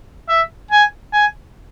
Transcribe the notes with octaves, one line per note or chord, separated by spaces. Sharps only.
E5
G#5
G#5